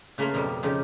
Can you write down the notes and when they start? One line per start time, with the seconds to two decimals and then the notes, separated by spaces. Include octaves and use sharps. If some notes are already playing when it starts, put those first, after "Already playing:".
0.18 C#3 A3 A#3 B4 A#5 C6
0.34 F2 B2 F3 G3
0.63 C#3 F3 D#4 G4